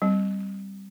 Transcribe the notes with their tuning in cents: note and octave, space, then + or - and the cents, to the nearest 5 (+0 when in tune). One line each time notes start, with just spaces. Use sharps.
G3 +0 C4 +0